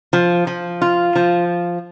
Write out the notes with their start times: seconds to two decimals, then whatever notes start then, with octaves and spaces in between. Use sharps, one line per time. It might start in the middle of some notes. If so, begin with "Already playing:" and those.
0.13 F3
0.47 F3
0.82 F4
1.16 F3